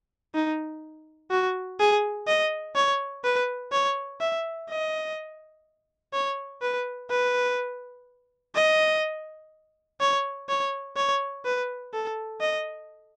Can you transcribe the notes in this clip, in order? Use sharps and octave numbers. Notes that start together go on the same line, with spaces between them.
D#4
F#4
G#4
D#5
C#5
B4
C#5
E5
D#5
C#5
B4
B4
D#5
C#5
C#5
C#5
B4
A4
D#5